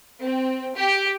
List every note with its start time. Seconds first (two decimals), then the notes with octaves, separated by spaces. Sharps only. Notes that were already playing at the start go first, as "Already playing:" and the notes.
0.23 C4
0.76 G4